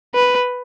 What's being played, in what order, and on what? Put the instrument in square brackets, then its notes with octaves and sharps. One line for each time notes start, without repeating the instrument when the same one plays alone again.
[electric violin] B4